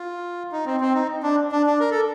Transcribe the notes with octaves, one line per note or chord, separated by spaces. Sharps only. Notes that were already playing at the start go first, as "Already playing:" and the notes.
Already playing: F4
D#4
C4
C4
D#4
D4
D4
D4
A#4
A4